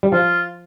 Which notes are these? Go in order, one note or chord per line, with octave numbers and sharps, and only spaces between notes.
G3
F3 F4